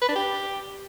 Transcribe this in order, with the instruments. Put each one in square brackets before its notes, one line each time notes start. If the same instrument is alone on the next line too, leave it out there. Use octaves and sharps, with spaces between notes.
[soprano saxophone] B4
D4
G4